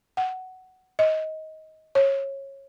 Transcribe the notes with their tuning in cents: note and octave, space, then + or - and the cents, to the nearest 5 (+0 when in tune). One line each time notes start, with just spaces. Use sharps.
F#5 +10
D#5 +20
C#5 -20